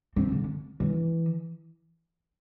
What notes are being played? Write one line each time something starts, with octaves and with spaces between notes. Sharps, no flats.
C4
D3
E3